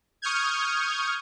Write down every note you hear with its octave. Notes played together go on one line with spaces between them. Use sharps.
C#6 D#6 F6 G6 G#6